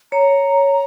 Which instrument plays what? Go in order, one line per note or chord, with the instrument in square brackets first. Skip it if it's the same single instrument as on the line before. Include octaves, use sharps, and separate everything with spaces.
[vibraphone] C#5 [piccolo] A#5